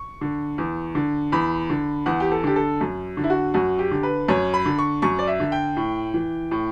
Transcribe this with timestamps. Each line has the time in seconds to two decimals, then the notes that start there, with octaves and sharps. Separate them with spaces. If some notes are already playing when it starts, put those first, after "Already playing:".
Already playing: C#6
0.21 D3
0.58 E2
0.95 D3
1.32 E2 B5
1.70 D3
2.06 E2 F#5
2.20 G4
2.32 A4
2.44 D3 G4
2.56 A4
2.81 F#2
3.17 D3
3.24 E4
3.30 F#4
3.54 F#2 F#4
3.79 G4
3.91 D3
4.03 B4
4.28 F#2 C#5
4.54 B5
4.66 D3
4.78 C#6
5.02 F#2 C#6
5.19 D5
5.27 E5
5.40 D3
5.52 G5
5.77 A2
6.14 E3
6.51 A2